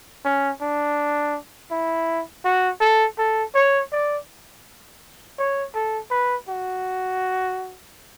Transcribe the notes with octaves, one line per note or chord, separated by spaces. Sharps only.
C#4
D4
E4
F#4
A4
A4
C#5
D5
C#5
A4
B4
F#4